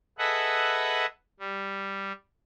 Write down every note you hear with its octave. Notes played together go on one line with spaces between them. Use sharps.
G#4 A4 B4 D#5 E5 F#5
G3